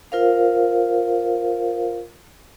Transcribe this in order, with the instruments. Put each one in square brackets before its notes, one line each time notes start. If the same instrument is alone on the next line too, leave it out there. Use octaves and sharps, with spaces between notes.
[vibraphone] F4 A#4 C5 F5